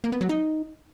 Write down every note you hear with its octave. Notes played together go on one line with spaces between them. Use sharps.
A#3
B3
F#3
D#4